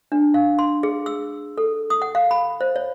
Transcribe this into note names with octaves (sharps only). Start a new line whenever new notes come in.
D4
F5
C6
G#4
E6
A4
D#6
F#5
F5
B5
C5
C#5